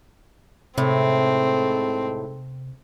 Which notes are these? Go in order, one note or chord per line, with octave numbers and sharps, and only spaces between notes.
A2 C3 G#3 C4 D#4 A4